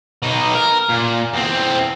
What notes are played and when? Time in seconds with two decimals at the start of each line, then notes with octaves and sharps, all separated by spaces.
0.23 B2 D#4
0.55 A#4
0.90 A#2
1.33 E2 C4